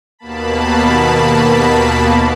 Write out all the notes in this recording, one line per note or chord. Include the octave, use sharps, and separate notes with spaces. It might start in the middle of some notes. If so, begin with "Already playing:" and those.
D#2 B2 A#3 A5 B5